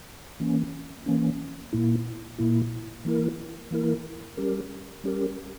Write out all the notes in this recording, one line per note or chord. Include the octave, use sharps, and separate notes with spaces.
E3 A#3 C#4
E3 A#3 C#4
A#2 A#3 E4
A#2 A#3 E4
E3 A#3 E4 A#4
E3 A#3 E4 A#4
G3 C#4 G4 A#4
G3 C#4 G4 A#4